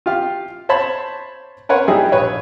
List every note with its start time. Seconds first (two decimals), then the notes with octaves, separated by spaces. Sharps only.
0.06 F4 G4 F5
0.69 C5 C#5 A5 B5
1.69 A#4 B4 C#5 F#5 C6
1.88 G3 D#4 E4 G4 G#4
2.12 A#1 B4 C#5